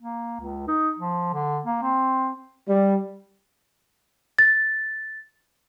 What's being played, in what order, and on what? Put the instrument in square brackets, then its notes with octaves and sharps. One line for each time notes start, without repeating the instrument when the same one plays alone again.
[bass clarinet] A#3
C#2
D#4
F3
D3
A#3
C4
[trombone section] G3
[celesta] A6